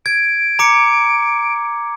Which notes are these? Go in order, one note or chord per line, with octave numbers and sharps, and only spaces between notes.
G#6 D7
A#5 D6 C#7